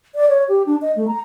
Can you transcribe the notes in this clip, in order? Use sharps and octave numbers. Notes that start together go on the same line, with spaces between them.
D5
C#5
G4
D4
D#5
A3
A#5